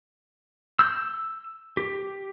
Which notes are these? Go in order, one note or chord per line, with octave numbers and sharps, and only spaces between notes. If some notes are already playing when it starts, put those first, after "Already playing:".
E6 G6
G4